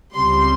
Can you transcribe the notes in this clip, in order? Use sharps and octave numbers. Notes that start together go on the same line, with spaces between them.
C#2 C#3 G3 C4 C6